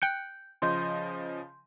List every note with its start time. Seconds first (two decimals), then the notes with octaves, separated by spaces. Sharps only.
0.02 G5 F#6 G6 C#7
0.62 C#3 F3 D#5 C6 G6